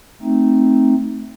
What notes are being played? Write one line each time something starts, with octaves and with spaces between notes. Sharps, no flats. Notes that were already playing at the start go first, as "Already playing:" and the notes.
A3 C4 D#4